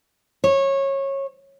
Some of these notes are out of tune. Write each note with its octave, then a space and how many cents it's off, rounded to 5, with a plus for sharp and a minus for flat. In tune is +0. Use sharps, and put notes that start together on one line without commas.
C#5 -20